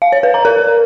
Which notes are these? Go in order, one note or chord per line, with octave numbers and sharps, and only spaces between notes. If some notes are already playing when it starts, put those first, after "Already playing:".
F5
C#5
B4
A#5
A#4